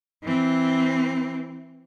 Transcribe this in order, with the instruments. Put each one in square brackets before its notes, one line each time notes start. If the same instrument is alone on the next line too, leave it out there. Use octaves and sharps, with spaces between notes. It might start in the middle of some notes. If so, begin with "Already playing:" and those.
[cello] E3 C4